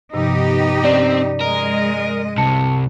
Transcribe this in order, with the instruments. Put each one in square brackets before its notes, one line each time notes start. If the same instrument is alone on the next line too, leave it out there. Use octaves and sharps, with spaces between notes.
[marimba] G2 C3 F3 [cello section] B3 D#4 G4
[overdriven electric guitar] C4 [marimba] C#4 [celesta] D5
[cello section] G#3 D#5 [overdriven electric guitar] A#4
[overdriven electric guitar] C2 C3 [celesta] A5 C#7